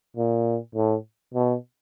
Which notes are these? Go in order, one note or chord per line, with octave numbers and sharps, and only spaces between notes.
A#2
A2
B2